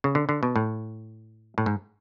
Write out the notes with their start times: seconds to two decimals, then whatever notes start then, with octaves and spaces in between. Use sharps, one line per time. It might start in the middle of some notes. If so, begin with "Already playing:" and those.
0.04 C#3
0.15 D3
0.29 D3
0.43 B2
0.56 A2
1.58 A2
1.66 G#2